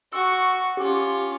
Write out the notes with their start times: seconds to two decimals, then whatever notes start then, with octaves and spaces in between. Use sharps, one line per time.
0.13 F#4 C#6 E6
0.77 C#4 F4 G4 D6